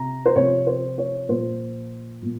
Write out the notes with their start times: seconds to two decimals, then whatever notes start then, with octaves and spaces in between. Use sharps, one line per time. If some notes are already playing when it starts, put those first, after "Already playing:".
Already playing: C3 A#5
0.26 C5
0.36 C3 F3 C#5
0.67 C5
0.98 C#5
1.29 A#2 F3 C5
2.22 A#2 F3